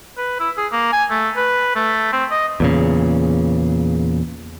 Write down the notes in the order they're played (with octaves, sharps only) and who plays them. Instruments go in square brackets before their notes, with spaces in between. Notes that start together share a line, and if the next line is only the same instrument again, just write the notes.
[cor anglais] B4
E4
G#4
A#3
G#5
A3
B4
A3
C4
D#5
[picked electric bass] E2 A#2 C#3